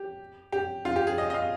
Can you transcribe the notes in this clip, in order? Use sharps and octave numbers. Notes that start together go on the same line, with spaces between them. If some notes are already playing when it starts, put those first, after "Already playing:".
Already playing: G4
G4
F4
G4
G#4
D#5
D#5
F5